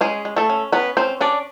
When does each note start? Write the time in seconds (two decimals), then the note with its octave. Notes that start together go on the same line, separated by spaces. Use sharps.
0.01 G#3 C#4 G#4
0.25 G#3
0.36 A3 A4
0.50 C#4
0.72 B3 C#4 B4
0.97 C4 C#4 C5
1.21 C#4 D4 D5